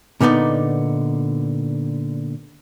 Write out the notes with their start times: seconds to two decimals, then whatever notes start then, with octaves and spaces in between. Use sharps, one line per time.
0.21 A#2 D3 B3 D#4 D5